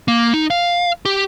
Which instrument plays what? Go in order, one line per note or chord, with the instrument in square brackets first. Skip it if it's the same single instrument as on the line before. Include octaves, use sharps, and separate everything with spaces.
[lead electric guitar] A#3
D#4
F5
G4